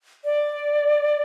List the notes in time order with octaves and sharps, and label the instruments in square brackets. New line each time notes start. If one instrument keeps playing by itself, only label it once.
[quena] D5